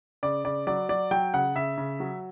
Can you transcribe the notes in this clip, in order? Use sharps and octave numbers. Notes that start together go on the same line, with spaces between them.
C#3 D5
C#3 D5
F#3 D5
F#3 D5
F#3 G5
C#3 F#5
C#3 E5
C#3
F#3